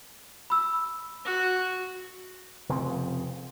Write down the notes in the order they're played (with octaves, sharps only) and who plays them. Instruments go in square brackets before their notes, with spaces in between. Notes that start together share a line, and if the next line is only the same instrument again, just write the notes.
[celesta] B5 E6
[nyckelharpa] F#4
[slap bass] F1 C#3 F3 C4